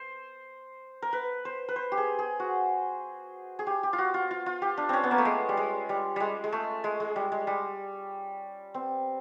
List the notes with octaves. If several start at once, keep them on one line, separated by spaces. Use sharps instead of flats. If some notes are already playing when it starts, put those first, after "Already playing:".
Already playing: C5
A#4
B4
C5
B4
C5
G4
G#4
G#4
F#4
G#4
G4
G4
F4
F#4
F4
F4
F4
G4
D4
C4 C#4
B3
A#3
A3
G#3
G3
G#3
G3
G3 G#3
G#3
A3
G#3
G#3
G3
G#3
G3
C4